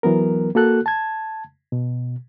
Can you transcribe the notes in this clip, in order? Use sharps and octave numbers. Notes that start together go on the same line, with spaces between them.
E3 F#3 B3 A#4
A#3 F#4 A4 F#6
A5 G#6
B2